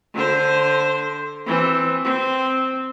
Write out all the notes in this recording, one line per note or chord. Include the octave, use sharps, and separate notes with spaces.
D3 C5
E3 C4
C4